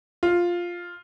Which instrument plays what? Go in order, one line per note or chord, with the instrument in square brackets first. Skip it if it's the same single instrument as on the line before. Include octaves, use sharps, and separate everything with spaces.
[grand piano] F4